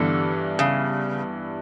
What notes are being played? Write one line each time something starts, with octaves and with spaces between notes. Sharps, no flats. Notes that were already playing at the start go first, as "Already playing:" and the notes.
Already playing: G2 D3 E3 B3
C#3